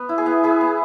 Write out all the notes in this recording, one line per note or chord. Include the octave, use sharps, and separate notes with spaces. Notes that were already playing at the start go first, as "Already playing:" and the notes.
Already playing: B3
E4
G#4
B3
E4 G#4
B3